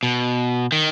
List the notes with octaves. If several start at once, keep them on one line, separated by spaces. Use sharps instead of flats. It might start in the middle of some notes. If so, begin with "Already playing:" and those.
B2
D#3